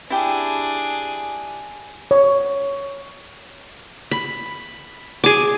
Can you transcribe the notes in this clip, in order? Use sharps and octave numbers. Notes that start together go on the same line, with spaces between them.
D4 E4 G4 G#4
C#5
B5
G#4 D6